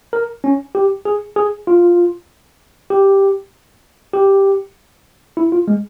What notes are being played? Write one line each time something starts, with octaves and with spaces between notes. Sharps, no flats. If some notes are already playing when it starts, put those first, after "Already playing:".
A#4
C#4
G4
G#4
G#4
F4
G4
G4
E4
F4
G#3